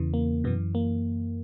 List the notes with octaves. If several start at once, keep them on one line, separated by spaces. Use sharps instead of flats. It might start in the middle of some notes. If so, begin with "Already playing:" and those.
Already playing: E2 C#3 E3
A#3
F#2 B2 E3 B3
A#3